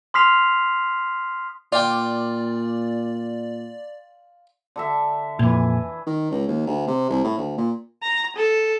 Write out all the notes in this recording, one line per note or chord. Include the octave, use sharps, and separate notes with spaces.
C6 D#6 F6 B6 C7 F7
A#2 F4 D5 G5
D3 A4 E5
F2 A#2 E3 G#5
D#3
C#2
D#2
D2
C3
C2
A2
D2
A#2
A#5
A4